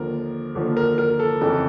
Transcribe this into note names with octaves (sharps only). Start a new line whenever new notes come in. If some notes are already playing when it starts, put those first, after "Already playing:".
Already playing: D#2 D3 F3 A#4
D#2 D3 F3
A#4
A#4
A4
F2 C#3 E3 A4